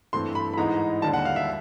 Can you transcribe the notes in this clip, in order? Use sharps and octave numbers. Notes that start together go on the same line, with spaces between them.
G2 E3 A3 C4 C6
B5
B5
G#2 E3 G#3 B3 D#4 A#5
D#2 D3 G3 A5
F#5
F5
E5